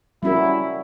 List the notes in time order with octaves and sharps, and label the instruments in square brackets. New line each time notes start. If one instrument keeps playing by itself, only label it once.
[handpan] G3 C#4 F#4 A#4 [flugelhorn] E4